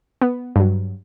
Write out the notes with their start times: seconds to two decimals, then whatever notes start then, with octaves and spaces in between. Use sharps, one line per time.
0.22 B3
0.56 G2 F#3